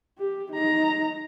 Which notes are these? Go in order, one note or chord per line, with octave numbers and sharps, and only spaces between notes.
G4
D#4 A#5